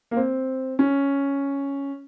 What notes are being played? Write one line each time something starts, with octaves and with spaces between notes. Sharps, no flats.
A#3
C4
C#4